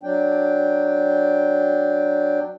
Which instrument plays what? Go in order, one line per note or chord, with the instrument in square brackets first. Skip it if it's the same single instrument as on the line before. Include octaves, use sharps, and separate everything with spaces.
[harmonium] F#3 D4 G5